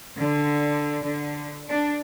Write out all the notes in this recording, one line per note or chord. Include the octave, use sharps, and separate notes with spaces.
D3
D3
D4